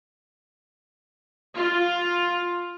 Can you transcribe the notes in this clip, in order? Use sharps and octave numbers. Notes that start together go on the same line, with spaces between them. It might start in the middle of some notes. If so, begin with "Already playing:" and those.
F4